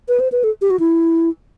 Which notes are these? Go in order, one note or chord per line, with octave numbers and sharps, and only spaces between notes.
B4
C5
B4
A4
G4
F#4
E4